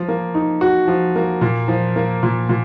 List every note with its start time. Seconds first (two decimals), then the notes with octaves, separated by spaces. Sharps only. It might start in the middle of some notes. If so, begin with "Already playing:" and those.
Already playing: F3
0.08 A#3
0.35 D#4
0.61 F#4
0.88 F3
1.16 A#3
1.41 A#2
1.68 F3
1.96 A#3
2.23 A#2
2.49 A#2